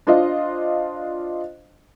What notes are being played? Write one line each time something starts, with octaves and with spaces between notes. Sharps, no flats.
D4 F4 C5 D#5 F5